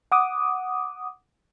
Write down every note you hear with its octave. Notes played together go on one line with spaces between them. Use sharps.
F#5 D6 D#6